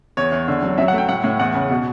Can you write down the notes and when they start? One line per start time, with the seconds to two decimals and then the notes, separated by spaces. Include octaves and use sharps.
0.17 E2 C#5
0.32 E2
0.48 D3
0.62 F#3
0.78 F#3 E5
0.88 F#5
0.94 A3 G5
1.08 A2 F#5
1.24 A2
1.39 E2 F#5
1.54 C#3
1.70 B2